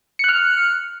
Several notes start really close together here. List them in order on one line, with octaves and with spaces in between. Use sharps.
C#7 F#6 F6